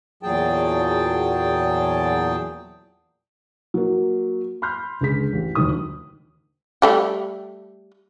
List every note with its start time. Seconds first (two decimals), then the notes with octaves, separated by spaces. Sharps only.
0.23 E2 A#2 F#3 G#4 G5 A5
3.74 F#3 A#3
4.62 B5 C6 F6 G6
5.01 C#2 D3 G#4 B6
5.33 A1
5.55 D#1 D2 D#3 D#6
6.82 G3 A3 G4